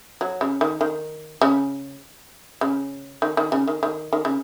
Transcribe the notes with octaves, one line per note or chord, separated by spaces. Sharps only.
F#3
C#3
D#3
D#3
C#3
C#3
D#3
D#3
C#3
D#3
D#3
D#3
C#3